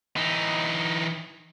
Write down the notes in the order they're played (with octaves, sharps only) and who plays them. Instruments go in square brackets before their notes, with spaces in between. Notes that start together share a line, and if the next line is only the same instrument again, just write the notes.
[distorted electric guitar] E3 D#4